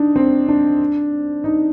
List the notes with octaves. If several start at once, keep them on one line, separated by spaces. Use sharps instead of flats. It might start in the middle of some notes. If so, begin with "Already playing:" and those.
Already playing: D4 D#4
C4
D4
D#4